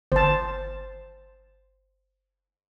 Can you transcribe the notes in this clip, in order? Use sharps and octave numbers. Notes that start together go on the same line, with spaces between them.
G1 C5 A5